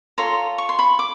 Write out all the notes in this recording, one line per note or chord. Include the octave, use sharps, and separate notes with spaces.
F4 A4 C#5 A#5 C6
C#6
C6
B5 C#6
D6